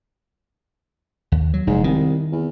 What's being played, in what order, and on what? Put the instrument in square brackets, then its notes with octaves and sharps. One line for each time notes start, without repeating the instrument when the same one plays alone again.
[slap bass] D#2
F#3
[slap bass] F1 [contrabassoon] G#2
[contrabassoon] C2 [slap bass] D#3
[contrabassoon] E2